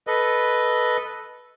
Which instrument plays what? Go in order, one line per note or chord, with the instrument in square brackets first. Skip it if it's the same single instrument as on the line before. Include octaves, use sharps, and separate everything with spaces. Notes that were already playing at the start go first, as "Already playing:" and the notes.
[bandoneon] A4 B4 D#5